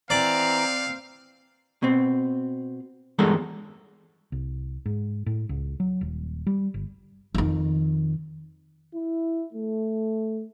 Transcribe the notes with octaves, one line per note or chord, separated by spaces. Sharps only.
E3 C4 D5 F5 A#5
B2 C4
E2 G2 G#3 A4 A#4
C2
G#2
A2
C#2
F#3
D#1
G3
G1
F2 D#3
E4
A3